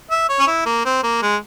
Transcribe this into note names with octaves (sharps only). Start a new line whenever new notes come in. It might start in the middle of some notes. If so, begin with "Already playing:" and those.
E5
C#5
C#4
E4
A#3
C4
A#3
G#3